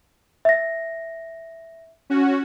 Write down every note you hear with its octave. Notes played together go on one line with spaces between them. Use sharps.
E5 A#6
C#4 F#4